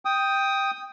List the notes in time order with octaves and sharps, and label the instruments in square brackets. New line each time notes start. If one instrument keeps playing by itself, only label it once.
[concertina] G5 D#6